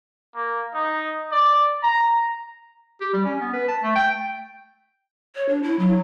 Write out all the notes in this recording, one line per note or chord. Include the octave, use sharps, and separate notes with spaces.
A#3
D#4
D5
A#5
G4
G3
C#4
B3
B4
A5
A3
G5
C#5
D4
E4
F#3